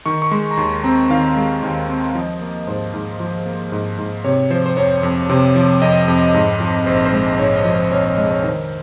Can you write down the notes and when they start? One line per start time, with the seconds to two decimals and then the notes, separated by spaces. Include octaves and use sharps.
0.06 D#3 C#6
0.22 C#6
0.31 G#3 C6
0.51 A#5
0.57 D#2 C6
0.84 C4 A#5
1.10 D#3 F5
1.36 G#3
1.63 D#2
1.88 C4
2.10 F5
2.15 F3 D#5
2.41 A#3
2.67 G#2 C5
2.94 G#2
3.20 F3
3.46 A#3
3.72 G#2
3.98 G#2
4.24 C3 C#5
4.50 F3 C5
4.66 C5
4.77 F2 C#5
5.03 F2
5.29 C3 C5
5.55 F3
5.82 F2 D#5
6.08 F2
6.34 G#2
6.60 F3
6.86 A#1 C5
7.05 C5
7.12 G#3
7.39 G#2 C#5
7.56 D#5
7.65 F3
7.74 C5
7.91 A#1 C#5
8.04 C#5
8.17 G#3 D#5
8.30 C#5
8.43 D#3 C5